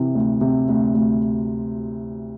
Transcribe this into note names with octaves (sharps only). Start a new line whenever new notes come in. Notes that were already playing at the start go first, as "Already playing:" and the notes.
Already playing: C3 E3
D2
C3
D2
D2